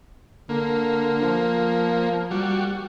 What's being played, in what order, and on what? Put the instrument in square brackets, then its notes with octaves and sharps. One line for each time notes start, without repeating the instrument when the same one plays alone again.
[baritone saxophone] D3 [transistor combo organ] A#3
[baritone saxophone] F3
[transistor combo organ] G3 F#4